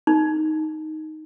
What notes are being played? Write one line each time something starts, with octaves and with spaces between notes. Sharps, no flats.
D#4